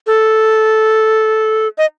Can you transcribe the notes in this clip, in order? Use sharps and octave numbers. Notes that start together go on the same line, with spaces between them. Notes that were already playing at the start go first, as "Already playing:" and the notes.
A4
D#5